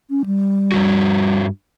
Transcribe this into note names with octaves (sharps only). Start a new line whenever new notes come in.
C#4
G3
G2 D#3 F#4